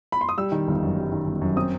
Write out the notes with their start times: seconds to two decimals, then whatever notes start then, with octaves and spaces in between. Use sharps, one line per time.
0.12 B5
0.21 C6
0.29 D#6
0.37 G3 E6
0.52 D#3
0.68 G1
0.82 F#2
0.97 G3
1.12 D#3
1.27 G1
1.41 F#2
1.56 C4 D#6